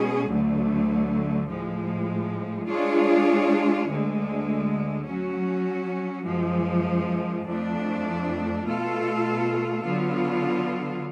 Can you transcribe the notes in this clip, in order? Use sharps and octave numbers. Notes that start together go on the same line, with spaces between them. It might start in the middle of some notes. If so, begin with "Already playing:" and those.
Already playing: B2 G#3 C#4 G#4
D2 D3 F#3 A3
A2 F3 G#3
G#3 D4 F4 G#4 C#5
D2 D3 G#3
F#3 C#4 F#4
F#2 F3 G#3
F2 F3 A3 D4
B2 A3 F4 A4
D3 F#3 B3 F4